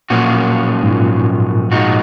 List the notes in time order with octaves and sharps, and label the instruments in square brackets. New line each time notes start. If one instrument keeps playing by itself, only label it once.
[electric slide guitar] F#2 F3 A#3 C#4 F#4 [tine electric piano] A#2
[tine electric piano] G#2
A#2
[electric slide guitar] F3 G#3 D#4 F#4